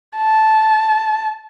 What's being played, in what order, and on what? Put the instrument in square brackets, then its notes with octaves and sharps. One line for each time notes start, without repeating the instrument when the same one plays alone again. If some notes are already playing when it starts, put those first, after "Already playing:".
[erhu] A5